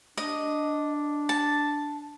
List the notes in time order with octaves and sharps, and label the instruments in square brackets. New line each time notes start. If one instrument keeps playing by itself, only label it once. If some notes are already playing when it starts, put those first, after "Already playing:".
[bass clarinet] D4 [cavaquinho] D#5
[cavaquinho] A5